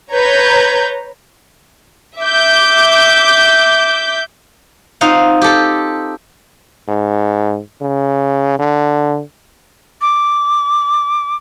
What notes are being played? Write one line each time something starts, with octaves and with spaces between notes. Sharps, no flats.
B4 C#5 A#5 G6 G#6
E5 D6 G6
C4 D#4 F4 F5 F#5
G4 A4
G#2
C#3
D3
D6